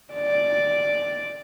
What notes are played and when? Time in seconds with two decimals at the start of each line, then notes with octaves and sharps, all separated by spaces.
0.14 D5